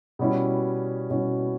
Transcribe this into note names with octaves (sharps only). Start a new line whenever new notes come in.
B2 G3 C#4 E4
B2 G3 C#4 E4